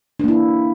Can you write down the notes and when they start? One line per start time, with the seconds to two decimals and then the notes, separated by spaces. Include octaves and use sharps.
0.20 D4
0.24 A#3
0.28 E4